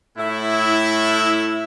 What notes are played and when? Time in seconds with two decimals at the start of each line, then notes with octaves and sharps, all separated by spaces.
0.17 A2 E4